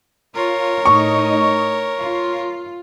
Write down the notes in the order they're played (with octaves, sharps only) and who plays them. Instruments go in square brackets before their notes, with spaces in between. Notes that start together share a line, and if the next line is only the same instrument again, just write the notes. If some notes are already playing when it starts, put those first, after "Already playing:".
[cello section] F4 [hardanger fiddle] A#4 C#5
[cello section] A2 D#4 D#5 [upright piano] C#6
[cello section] F4